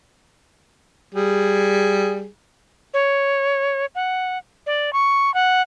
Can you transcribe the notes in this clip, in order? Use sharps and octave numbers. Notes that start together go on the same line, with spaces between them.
G3 G#4
C#5
F#5
D5
C#6
F#5